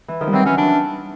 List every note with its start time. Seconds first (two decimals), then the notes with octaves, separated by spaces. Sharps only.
0.08 E3
0.21 D#3 F3
0.27 G3
0.33 E3 F#3 C4
0.45 E3 F#3 C#4
0.58 E3 D4